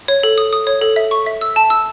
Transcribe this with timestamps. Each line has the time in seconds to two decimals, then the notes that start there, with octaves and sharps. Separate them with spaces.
0.08 C#5
0.23 A4
0.38 D#6
0.53 D#6
0.67 C#5
0.82 A4
0.96 E5
1.11 C#6
1.26 E5
1.41 E6
1.56 A5
1.70 E6